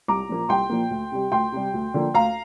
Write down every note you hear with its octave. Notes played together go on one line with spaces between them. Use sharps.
C2 A#5 D6
A#2 F3 A#3
C2 G5 C6
A#2 F3 A#3
D2
C3 G3
D2 G5 C6
C3 G3
D2
D3 F3 A#3
D2 F5 A#5